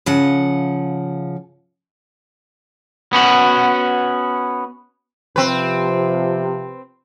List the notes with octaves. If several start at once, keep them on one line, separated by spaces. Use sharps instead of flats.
C#3 F3 F#5
B3 C#4 F#4
C3 F3 C4 B4